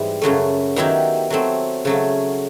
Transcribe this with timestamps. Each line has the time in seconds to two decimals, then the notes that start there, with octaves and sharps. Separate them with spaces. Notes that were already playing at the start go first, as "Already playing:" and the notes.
Already playing: G#2 E3 G3 C4
0.22 F#2 C#3 F#3 A3
0.76 D#3 F#3 B3 E4 G4
1.30 F#3 A3 C4
1.85 C#3 F#3 A3